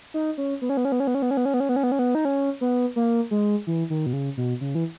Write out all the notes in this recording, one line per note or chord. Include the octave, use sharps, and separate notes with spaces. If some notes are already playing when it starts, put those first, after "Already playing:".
D#4
C#4
B3
C#4
B3
C#4
B3
C#4
B3
C#4
B3
C#4
B3
C#4
B3
C#4
B3
C#4
B3
C#4
B3
D#4
C#4
B3
A#3
G#3
E3
D#3
B2
C#3
B2
C#3
E3